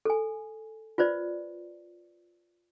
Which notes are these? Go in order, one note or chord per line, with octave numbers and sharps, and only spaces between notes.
A4 G#5
F4 B4 C5 D5